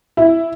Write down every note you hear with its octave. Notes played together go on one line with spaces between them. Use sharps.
E4